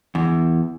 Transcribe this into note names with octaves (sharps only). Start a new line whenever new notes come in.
E2